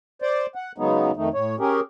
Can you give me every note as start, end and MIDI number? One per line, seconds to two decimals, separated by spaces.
0.22 0.46 72
0.22 0.46 74
0.55 0.72 78
0.78 1.11 49
0.78 1.11 54
0.78 1.11 56
0.78 1.11 59
0.78 1.11 63
1.16 1.29 41
1.16 1.29 51
1.16 1.29 57
1.16 1.29 63
1.34 1.55 45
1.34 1.55 73
1.59 1.80 61
1.59 1.80 67
1.59 1.80 68
1.59 1.80 70